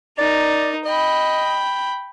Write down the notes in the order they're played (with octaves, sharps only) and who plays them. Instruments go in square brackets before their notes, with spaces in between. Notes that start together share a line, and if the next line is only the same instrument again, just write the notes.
[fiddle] D#4 A#4 [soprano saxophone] D5
[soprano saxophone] D#5 [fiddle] G5 B5